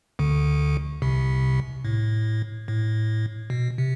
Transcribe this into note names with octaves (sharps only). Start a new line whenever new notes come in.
D2 D3
C2 C3
A2
A2
B2
C3